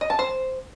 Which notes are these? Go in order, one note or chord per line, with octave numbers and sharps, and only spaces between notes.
D#5
A5
C5